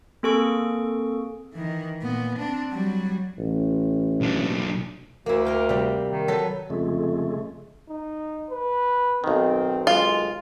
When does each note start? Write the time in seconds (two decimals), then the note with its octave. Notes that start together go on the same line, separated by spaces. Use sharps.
0.23 A#3 C4 G#4 A4 C#6 D7
1.54 D#3 E3
2.02 A#2 B3
2.39 C4 D4
2.72 F#3 G3
3.38 A1
4.21 B1 D4
5.26 D2 A#3 E4
5.45 A#4 F5 G5
5.69 C3 G3
6.10 D#3
6.28 F#3 A4 B4
6.70 F2 C#3 G#3 A3
7.88 D#4
8.51 B4
9.24 B1 D#3 C4
9.87 G#3 F4